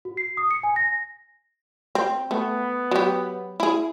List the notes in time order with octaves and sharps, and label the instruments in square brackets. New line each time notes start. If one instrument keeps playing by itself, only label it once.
[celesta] F#4
C7
D#6
C#7
G#5
A#6
[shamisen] C4
[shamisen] A3 [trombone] B3
[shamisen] F#3 G4
E4 G#4